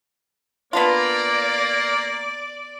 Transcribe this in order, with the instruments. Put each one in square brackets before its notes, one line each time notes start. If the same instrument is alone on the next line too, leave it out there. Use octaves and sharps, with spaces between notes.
[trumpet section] A#3 [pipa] B3 D4 F4 [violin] D5